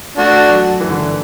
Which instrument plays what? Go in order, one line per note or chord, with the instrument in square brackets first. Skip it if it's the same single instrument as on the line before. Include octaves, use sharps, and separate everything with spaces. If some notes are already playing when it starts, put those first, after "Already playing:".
[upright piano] A3 [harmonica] D4 F#4
[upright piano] F#3
E3
D3
E3